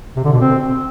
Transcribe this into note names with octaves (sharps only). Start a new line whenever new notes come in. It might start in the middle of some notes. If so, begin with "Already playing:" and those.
C3
D3
B2
C4